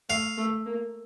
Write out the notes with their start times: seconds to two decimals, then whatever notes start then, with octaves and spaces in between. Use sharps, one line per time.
0.09 A3 F5
0.38 A3
0.66 A#3